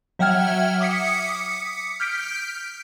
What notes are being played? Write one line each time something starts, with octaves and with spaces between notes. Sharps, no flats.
F#3 E5 F#5 G5 F6 G#6
D6 D#6 B6 C#7
F6 G6 B6 D7